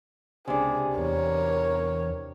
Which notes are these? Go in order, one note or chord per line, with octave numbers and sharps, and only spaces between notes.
C#2 C3 D4 G#4
E2 A#4 C#5